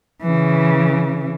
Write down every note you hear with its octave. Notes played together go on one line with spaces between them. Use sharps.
C#3 E3